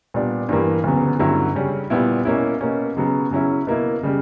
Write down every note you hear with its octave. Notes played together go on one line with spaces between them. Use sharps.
A#2 G3 B3 D4
G2 E3 G3 A#3
D2 C#3 F#3 B3
G2 D3 F#3 C#4 E4
C#3 G3 C#4
A#2 G3 B3 E4
B2 A#3 C#4 E4
B2 A#3 C#4
C#3 F#3 B3
C#3 F#3 C#4 E4
B2 A#3 E4
C#3 G3